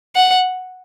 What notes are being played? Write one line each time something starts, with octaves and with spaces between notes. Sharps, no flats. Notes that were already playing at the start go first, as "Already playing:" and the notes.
F#5